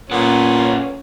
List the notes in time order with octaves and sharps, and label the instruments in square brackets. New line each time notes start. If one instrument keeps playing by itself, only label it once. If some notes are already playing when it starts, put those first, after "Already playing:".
[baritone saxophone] A#2 [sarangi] C#4 [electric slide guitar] A4 B4 F#5